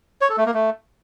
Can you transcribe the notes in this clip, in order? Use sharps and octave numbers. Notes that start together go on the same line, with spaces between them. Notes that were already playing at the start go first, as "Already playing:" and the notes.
C#5
A4
A3
A#3
A3